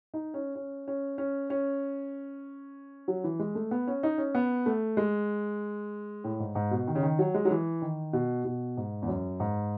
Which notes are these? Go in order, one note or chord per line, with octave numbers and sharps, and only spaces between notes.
D#4
C#4
C#4
C#4
C#4
C#4
F#3
E3
G#3
A3
B3
C#4
D#4
C#4
B3
A3
G#3
A2
G#2
G#2
B2
D#3
C#3
D#3
F#3
G#3
F#3
E3
D#3
B2
B2
G#2
E2
F#2
G#2